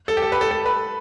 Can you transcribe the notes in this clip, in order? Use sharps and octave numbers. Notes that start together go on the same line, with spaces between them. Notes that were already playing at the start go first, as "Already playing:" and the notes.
A4
G4
A4
B4
A4
A4
B4